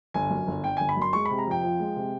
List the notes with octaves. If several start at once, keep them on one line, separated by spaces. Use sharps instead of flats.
G1 G#5
F#2
G1
D3 G5
G1 G#5
B5
F#2 C6
G#3 C#6
C3 B5
A#5
F2 G5
F3
G#3
C3